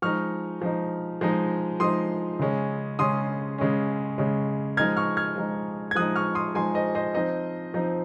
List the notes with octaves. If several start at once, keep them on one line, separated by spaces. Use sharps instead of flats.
F3 G#3 D#4 C#6 F6
F3 G#3 D#4
F3 G#3 D#4
F3 G#3 D#4 C6 D#6
C#3 G#3 C#4
C#3 G#3 C#4 C6 D#6
C#3 G#3 C#4
C#3 G#3 C#4
F3 G#3 D#4 F6 G#6
C#6 F6
F6 G#6
F3 G#3 D#4
G#6
F3 G#3 D#4 D#6 F#6
C#6 F6
C6 D#6
F3 G#3 D#4 G#5 C6
C5 D#5
C5 D#5
F3 C4 D#4 C5 D#5
F3 C4 D#4